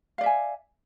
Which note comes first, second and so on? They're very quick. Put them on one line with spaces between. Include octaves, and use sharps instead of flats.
F5 D5 E5 G#5